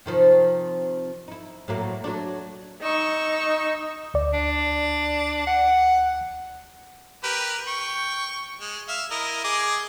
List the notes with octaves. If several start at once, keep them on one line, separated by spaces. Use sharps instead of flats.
C3 D#3 F3
D#4 E4
A2 F#3 A#3
F#3 A3 D4
D#4 C#6 E6
D2 D5
D4
F#5
G4 A#4 B4
G5 C#6
G#3
E5 F5
E4 A#4 D#5
G#4 D#5 D6